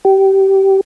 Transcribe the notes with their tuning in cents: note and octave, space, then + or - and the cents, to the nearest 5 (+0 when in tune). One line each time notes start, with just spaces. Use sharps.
G4 -20